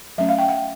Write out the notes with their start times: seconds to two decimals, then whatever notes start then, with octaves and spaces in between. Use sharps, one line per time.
0.18 F#3 A3 C#4 E5
0.29 F5
0.38 G5
0.48 F#5